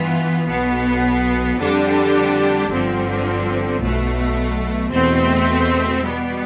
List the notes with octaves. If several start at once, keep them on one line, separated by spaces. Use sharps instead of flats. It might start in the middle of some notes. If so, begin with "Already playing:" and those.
Already playing: G2 E3 B3 F4
B1 B2 B3
F2 D3 G3 D4 G4
G1 G2 D3 F3 C4
B1 B2 A3
E2 B2 A3 C4
B2 G3 B3